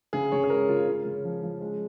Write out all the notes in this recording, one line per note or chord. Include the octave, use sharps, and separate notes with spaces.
C#3 G#4
C#3 C#5
G#4
G#3 A#4
C#3 F4
G#3 C#4
C#3
F3
F3
G#3